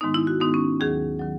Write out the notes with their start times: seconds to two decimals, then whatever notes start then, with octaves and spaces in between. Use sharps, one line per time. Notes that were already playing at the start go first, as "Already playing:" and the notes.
0.01 G#2 D#3 G#3 B3 D#4
0.14 E4
0.27 F#4
0.40 G#2 D#3 G#3 B3 D#4
0.54 C#4
0.80 D#2 D#3 F#3 G#4
1.19 D#3 F#3